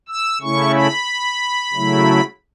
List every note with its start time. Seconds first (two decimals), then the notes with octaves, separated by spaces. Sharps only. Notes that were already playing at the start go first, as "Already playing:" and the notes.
0.08 E6
0.41 C#3 A3 C#4 E4 C#6
0.75 B5
1.74 C#3 F#3 A3 E4